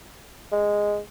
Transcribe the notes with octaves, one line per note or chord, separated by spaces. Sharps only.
G#3